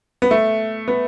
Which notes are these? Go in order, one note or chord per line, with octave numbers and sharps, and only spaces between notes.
B3
A3
B3